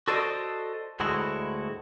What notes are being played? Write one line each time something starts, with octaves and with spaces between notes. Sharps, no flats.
F#4 A4 C5 D5 D#5
D2 A2 G#3 E4 F#4